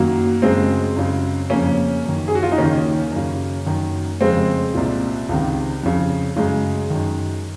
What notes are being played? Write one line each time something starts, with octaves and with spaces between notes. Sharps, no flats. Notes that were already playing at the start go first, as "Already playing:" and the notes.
Already playing: F#2 D#3 F#3 A#3
F#2 C#3 G#3 C4
F#2 C#3
F2 C#3 A#3 C#4
F#2 D#3
G#4
F#4
F4
D#4
D#2 D#3 A#3 C#4
F#2 C#3
F#2 D#3
F2 C#3 G#3 C4
C2 A#2
C#2 C3 D#3
F2 C#3
F#2 C#3 G#3
F#2 D#3